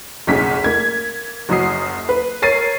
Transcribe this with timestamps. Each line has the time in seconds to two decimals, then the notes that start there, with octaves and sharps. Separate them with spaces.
0.27 F#1 B1 C#4 G#4 B6
0.64 A#3 G#6
1.49 F#1 F#2 F#4 D#6 C7
2.09 B4
2.42 A#4 C#5 A6 C7 D#7